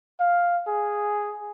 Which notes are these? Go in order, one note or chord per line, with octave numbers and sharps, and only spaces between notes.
F5
G#4